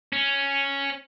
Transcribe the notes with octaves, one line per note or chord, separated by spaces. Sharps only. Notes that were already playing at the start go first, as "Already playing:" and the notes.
C#4